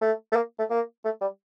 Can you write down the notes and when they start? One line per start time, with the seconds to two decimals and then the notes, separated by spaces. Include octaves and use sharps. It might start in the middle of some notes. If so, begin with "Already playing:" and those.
0.01 A3
0.32 A3
0.36 A#3
0.59 A3
0.70 A#3
1.05 A3
1.21 G3